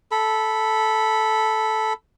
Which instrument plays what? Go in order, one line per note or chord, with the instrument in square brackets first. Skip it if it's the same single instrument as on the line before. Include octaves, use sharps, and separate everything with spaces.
[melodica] A4 B5